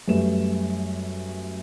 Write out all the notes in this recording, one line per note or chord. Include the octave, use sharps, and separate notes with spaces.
F#2 G3 A3 B4 E7